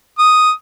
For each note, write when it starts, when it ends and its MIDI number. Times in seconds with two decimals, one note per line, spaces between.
0.19 0.51 87